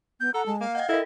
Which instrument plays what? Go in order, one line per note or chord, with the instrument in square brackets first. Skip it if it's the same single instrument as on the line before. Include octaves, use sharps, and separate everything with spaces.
[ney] B3 [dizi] G6
[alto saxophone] A4 [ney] F#5 [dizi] A#5
[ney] G#3 [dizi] A5
[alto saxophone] A#3 [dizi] F5
[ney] D#5 [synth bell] F#5 G5
[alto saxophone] E4 [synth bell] A4 A#4 [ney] D#5